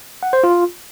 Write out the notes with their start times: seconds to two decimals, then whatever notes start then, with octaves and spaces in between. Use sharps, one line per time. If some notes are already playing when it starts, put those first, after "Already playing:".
0.23 F#5
0.33 C5
0.44 F4